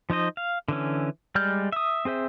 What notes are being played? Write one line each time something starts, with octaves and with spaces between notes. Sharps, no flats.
F3 D#4 C5 D#5
F5
D3 E3 C#4
G3 G#3 D5 F6 G6
E5 D#6
C4 G#4 C5 E5